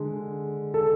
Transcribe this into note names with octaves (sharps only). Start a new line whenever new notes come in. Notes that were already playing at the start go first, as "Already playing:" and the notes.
Already playing: D3 G#3
A4